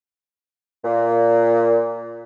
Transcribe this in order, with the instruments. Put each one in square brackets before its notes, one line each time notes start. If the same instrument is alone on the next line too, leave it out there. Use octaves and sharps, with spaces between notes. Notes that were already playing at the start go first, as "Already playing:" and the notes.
[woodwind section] A#2